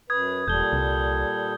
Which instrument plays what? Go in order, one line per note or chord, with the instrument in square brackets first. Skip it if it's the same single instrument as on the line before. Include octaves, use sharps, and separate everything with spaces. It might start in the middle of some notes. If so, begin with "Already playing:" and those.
[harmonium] F#2 B4 [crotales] D#6 G#6
[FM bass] E1 [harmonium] A#2 G3 A4 [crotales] G6 G7
[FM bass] C2